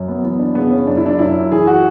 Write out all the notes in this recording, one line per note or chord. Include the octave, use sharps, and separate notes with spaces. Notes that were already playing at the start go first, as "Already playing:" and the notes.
Already playing: F#2
B3
E3 B3
D4
C#3 B3
C#4
F#2 D4
E4
D4
F#2 E4
E3 G#4
F#4